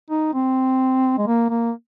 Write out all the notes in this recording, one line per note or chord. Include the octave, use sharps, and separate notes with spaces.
D#4
C4
G#3
A#3
A#3